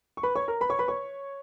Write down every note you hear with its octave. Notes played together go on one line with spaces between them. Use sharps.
C#6
B4 B5
C#5 C#6
A#4 A#5
B4 B5
C#5 C#6
B4 B5
C#5 C#6